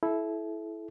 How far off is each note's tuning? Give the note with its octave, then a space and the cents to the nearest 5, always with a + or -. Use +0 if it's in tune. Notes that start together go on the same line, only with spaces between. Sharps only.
E4 +0 A4 -30